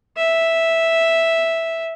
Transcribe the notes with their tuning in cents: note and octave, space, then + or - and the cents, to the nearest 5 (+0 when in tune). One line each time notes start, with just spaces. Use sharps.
E5 -5